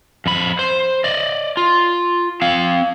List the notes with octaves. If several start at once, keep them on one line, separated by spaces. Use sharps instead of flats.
F2 B5
C5
D5 D#5
F4
C4 F5